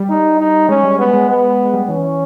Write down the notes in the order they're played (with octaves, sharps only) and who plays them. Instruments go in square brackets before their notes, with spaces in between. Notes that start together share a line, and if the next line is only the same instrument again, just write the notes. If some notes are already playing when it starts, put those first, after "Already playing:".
Already playing: [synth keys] G3
[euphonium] D#4
D#4
[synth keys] G#3 [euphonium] C#4
[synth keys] G3
[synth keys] G#3 [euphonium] B3
[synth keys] G#3
[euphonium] B3
[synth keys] G#3
G3
[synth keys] E3 [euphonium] C#4
[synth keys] E3